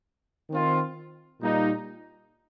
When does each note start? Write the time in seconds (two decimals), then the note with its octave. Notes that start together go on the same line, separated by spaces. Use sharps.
0.50 D#3 C4 F4
1.39 A#2 G3 A#3 D#4